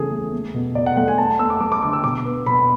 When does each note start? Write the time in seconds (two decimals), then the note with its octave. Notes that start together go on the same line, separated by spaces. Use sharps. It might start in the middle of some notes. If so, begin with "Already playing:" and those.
Already playing: C#3 E3 A3 G#4 A4
0.11 A3
0.33 A3
0.54 B2
0.75 B2 D5
0.86 F#5
0.97 A3 F#5
1.08 G#5
1.18 A3 A5
1.39 A3 E6
1.50 D6
1.60 A3 D6
1.72 D6
1.83 D3 D6
1.93 E6
2.04 B2 D6
2.25 B3
2.46 B2 B5